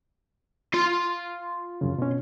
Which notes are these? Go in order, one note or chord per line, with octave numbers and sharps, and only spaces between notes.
F4 C6
C2 F#2 C#3
B2 C#4